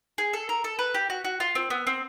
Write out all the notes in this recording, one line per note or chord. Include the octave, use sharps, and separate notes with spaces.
G#4
A4
A#4
A4
B4
G4
F#4
F#4
F4
C4
B3
C4